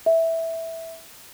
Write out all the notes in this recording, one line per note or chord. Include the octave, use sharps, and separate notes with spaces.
E5